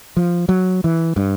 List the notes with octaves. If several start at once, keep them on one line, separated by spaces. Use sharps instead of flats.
F3
F#3
E3
G2